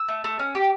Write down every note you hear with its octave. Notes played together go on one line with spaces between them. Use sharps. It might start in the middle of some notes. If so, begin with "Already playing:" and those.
Already playing: E6
A3
A3
C#4
G4